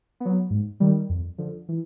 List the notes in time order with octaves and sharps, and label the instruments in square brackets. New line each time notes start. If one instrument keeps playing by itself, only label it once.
[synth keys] F#3 B3
G#2
D#3 G3
F2
D3 F3
E3